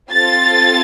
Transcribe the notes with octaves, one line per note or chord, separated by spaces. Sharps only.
C4 F4 A4 A6